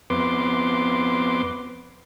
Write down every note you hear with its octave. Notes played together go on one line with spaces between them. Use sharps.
F2 B3 B4 C6 D6